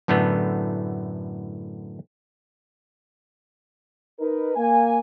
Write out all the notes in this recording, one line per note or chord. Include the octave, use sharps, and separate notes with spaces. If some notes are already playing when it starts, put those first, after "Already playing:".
F#2 A2 D3 A3 B3
D#4 A#4 B4
A#3 G#5